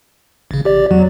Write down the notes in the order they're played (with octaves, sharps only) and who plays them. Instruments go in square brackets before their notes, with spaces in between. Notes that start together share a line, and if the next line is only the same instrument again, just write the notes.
[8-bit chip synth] A1 C#3
A1 G4 D5
[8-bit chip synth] E2 [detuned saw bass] F#3